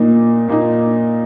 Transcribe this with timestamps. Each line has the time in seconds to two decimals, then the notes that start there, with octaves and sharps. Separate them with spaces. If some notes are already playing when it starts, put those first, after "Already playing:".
Already playing: A#2 A#3 D#4
0.48 A#2 A#3 D#4